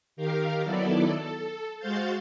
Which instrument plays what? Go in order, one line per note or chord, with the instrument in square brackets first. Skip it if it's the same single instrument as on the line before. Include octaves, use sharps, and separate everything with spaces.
[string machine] D#3 G4 A#4 F5
D#3 F#3 B3 E4 A4 D5
A4
G#3 F#4 C5 F5 G6 A6